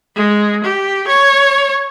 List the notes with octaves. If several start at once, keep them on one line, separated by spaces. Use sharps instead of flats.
G#3
G4
C#5